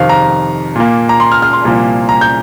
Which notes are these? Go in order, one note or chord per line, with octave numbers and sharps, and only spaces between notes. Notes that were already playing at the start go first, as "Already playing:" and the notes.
Already playing: F2 C3 D#3 F5
A#5
A#2 A#3
A#5
C6
F6
F6
C6
C2 A#2 F3 A#3
A#5
G6